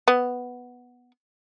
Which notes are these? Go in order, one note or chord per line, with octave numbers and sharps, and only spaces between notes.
B3